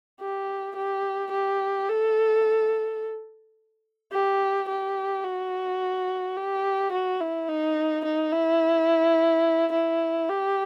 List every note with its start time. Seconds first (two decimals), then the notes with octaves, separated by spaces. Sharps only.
0.20 G4
0.76 G4
1.32 G4
1.89 A4
4.13 G4
4.68 G4
5.24 F#4
6.37 G4
6.92 F#4
7.21 E4
7.48 D#4
8.05 D#4
8.32 E4
9.72 E4
10.29 G4